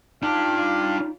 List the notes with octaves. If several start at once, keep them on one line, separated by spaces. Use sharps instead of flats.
D4 D#4 F4 G4 F5